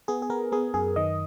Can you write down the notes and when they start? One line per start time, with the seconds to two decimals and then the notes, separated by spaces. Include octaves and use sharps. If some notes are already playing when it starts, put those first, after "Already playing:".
0.08 B3 G#4
0.22 G#4
0.30 B3 A#4
0.52 B3 G#4
0.74 F#2 G#4
0.96 D#3 D#5